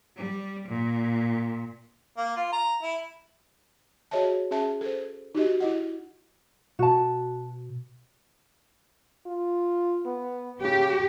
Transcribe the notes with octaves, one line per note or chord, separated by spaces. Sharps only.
G3
A#2
A#3
F4
A#5
E4
F#4 G#4 C#5 D#5 E5 A5
C#4 G#4 E5 A5
A4 C5
D#4 F#4 G4 D#5
E4 D#5 F#5
B2 F#4 A5
F4
B3
C#3 G4